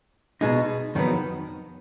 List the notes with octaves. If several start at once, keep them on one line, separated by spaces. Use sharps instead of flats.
B2 G#3 D#4
F2 D#3 F#3 B3